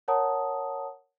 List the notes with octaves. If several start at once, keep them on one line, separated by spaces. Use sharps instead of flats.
A#4 C#5 F#5 A5 A#5 D#6